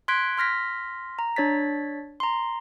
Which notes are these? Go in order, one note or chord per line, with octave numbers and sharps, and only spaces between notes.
C6 F#6 G#6 B6 D7
C6 F6 A#6 B6
A#5
D4 C#5 A6 B6
A#5 C6